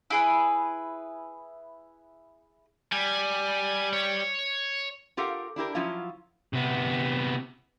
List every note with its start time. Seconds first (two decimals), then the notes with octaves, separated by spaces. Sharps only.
0.10 E4 G#4 B4
2.92 G3 G#5
3.93 C#5
5.17 F4 G4 A4 A#4 F5 F#5
5.56 D4 E4 G4 A#4
5.75 F3 F#3 C#4 E4 F4
6.53 C3 B3